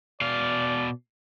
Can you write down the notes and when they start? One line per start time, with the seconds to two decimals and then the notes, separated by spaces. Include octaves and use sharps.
0.21 B2 D5 F5